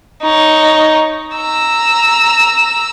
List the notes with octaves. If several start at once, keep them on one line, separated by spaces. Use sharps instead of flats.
D#4 C#5
A#5 E6